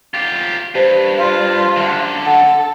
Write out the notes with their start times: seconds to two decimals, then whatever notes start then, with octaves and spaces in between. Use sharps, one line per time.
0.14 F4 G4
0.75 G2 G4 C5
1.18 F4
1.77 F#2 D3
2.26 A4 F#5